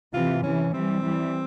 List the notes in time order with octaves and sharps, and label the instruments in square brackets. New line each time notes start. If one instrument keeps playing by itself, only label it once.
[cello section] C3 E3 [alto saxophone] F4
[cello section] C3 E3 [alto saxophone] C#4
[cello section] E3 G3 [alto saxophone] C4
[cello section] E3 G3